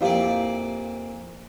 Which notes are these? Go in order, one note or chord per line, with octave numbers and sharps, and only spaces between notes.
F2 A#2 E4 G4 D5 F5